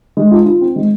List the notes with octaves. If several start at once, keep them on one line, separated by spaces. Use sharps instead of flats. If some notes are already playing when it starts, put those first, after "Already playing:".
G#3
F4
F4
C4
G#3